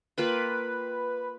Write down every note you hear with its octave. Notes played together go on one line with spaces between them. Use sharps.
A#3 F4 B4 G5